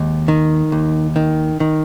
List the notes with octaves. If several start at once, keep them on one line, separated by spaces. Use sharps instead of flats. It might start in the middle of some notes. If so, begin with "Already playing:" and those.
Already playing: D#2 G#3
D#3
D#2
D#3
D#3